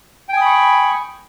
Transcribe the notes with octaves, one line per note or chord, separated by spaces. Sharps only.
G5 G#5 B5 C#6 D#6